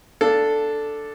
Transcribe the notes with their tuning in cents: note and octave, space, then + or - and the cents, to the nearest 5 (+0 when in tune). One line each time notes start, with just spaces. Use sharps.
D4 +0 A4 +0 F5 +0